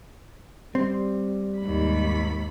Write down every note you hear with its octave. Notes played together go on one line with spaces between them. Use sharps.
G3 C4
D#2 G#2 B5